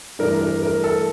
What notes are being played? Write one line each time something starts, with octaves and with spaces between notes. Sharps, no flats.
G2 E3 A3 D4 A#4
A#4
A#4
A4